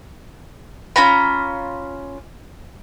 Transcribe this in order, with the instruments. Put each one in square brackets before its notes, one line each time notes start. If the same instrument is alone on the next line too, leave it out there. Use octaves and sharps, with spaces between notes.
[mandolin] C#4 F4 A#5 B5